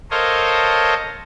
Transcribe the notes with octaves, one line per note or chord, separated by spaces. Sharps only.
A4 A#4 C5 C#5 D#5 F5